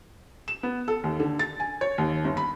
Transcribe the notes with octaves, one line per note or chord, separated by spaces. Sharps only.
E7
B3
A4
D#2
D3
A6
G#5
C#5
D#2
G1
B5